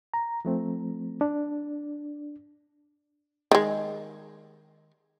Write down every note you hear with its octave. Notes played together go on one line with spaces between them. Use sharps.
A#5
F3 A3 C4
D4
D#3 G#3